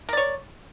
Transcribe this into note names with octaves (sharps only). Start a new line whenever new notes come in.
A#4 C#5 D5